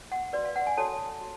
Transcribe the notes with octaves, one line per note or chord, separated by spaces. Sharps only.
F#5
F#4 B4 D5
F5
F#5
G#5
F#4 A4 C#5 A5
F#4